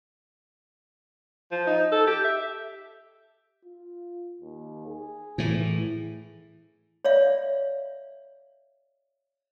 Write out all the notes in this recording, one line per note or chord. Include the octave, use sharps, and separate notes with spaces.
F3
D#4
A4
G4
E5
F4
D#2
G#4
A2 E3
C#5 D5 E5 F5